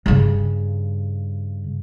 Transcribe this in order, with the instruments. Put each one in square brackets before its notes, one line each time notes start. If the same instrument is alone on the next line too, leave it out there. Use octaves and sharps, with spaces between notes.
[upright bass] G2 C#3